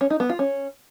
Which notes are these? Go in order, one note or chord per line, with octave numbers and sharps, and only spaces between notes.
C#4
D#4
B3
F4
C#4